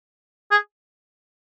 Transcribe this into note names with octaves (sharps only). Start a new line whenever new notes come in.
G#4